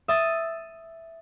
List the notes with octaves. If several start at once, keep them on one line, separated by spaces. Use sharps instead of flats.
E5 D#6 A6